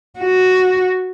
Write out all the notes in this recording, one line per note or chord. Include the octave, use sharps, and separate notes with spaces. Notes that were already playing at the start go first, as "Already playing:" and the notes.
F#4